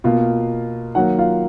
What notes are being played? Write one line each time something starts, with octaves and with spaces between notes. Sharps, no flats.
B2 A#3 F4 F5
D#3 F#3 A#3 F#4 F#5
F4 F5